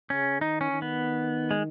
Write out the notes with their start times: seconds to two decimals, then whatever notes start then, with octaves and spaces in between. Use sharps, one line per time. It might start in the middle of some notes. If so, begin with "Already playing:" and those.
0.10 C#3 C#4
0.41 D#3 D#4
0.61 C#4
0.71 D#3
0.82 B3
1.51 G#3